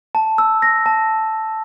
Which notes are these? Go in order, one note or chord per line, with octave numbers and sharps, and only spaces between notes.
A5
E6
A#6
A5